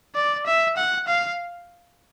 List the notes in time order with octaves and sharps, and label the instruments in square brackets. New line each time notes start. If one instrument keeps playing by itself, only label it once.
[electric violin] D5
E5
F#5
F5